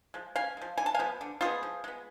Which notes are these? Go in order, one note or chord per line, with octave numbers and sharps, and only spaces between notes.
F3 G#3
C#3 F5 G#5
F3 G#3
D3 G#5
A5
F3 G#3 B3 F5 G#5
D3
F3 G#3 B3 F4 G#4
F3
G#3 B3